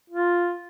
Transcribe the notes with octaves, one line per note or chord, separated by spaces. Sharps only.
F4